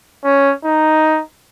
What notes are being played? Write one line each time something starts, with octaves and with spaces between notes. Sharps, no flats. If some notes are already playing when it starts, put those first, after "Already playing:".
C#4
D#4